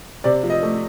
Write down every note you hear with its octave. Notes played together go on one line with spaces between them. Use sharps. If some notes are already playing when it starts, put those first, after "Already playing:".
C3 D5
F3
D#5
A3